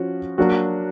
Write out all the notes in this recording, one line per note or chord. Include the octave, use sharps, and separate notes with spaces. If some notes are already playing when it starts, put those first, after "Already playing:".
Already playing: F3 C#4 F#4
F#3 A#3 D4 F#4